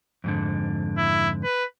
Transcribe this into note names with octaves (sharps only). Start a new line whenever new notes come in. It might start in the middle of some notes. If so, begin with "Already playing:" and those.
F2 G#2 D3
E4
B4